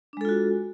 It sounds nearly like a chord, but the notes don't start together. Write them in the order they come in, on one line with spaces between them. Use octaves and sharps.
D4 G#3 A4 F4 F#4